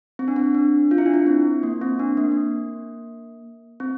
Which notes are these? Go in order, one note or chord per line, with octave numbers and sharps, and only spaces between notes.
C4
D4
C4
D4
F4
E4
D4
E4
C4
A#3
C4
D4
A#3
A#3
C4